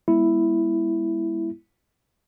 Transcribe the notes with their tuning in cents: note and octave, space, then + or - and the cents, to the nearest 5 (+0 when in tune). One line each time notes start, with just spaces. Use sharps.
G#3 -40 B3 -30 E4 +0